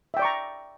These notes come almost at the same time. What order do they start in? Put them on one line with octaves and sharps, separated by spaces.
E5 G5 D5 C#6 A#5